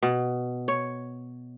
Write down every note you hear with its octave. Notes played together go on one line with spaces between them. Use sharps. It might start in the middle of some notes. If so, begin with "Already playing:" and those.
B2
C#5